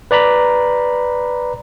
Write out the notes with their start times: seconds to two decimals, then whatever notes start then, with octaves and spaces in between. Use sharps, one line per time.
0.11 B4 D5 A#5 B5